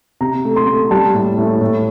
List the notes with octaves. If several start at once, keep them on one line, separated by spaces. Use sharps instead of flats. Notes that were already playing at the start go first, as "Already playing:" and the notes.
C3 A#5
A3
C6
A3
G3 A5
A2
A2
A2